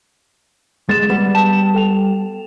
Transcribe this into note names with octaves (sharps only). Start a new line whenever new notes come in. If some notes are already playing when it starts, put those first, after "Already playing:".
G#3 A6 E7
G3 B3
G5 A5 E7
A4 G5 F7